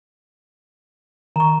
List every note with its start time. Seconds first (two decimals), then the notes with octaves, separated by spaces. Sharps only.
1.36 D#3 A#5 C#6